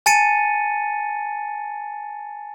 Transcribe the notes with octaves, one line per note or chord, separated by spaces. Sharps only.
G#5 A5 A6 C#7 D#7